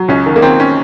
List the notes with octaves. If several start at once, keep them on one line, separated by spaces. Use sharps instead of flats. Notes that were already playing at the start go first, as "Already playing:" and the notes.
Already playing: F#3
C#2 C#4
D#3
A#3
D#3 C4
C#4